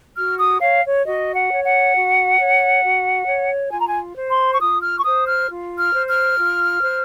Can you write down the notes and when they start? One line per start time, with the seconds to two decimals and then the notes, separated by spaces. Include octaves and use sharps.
0.16 F#4 F6
0.39 D#6
0.61 C#5 F5
0.83 C#5
1.05 F#4 D#5
1.35 F#5
1.50 C#5
1.64 F#5
1.94 F#4
2.38 C#5
2.83 F#4
3.27 C#5
3.71 F4 G#5
3.80 A#5
3.87 G#5
4.16 C5
4.30 C6
4.54 C#6
4.60 F4 D#6
4.82 F6
4.97 C#6
5.04 C5 D#6
5.27 F6
5.48 F4
5.78 F6
5.93 C5
6.08 F6
6.37 F4
6.82 C5